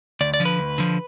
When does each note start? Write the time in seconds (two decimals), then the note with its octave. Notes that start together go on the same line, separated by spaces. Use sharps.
0.21 D2 D5
0.34 D5
0.40 D3 F3
0.45 B4
0.59 D2
0.78 D3 F3